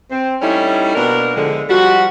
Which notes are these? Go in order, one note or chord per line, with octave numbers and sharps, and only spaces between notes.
C4
G3 A3 C#4 D#4 E4
B2 A#3 D4 A#4
A2 D3 F3 G#3
F3 G3 F#4